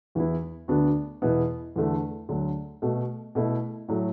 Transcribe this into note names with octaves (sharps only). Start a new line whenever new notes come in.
E2 E3 B3 E4
D2 D3 B3 D4 F#4
E2 B2 B3 E4
E2 D3 A3
D2 D3 F#3
B2 A3 F#4
B2 A3 E4
A2 F#3 A3